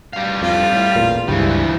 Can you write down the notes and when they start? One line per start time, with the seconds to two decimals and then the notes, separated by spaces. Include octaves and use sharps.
0.13 G3 F5
0.42 F2 F4
0.74 A2
0.95 A1 E2 A#2
1.28 C#2 G2 E3 F3 G3